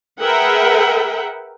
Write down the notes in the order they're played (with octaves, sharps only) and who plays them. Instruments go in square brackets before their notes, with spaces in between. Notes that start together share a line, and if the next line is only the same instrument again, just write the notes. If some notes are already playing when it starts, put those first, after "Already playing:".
[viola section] G#4 A#4 B4 E5 F#5 G5